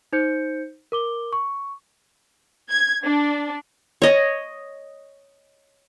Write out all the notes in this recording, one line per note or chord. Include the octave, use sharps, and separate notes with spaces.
D#4 C5 G6 C#7
A#4 D6 G7
C#6
G#6
D4
C#5 D#5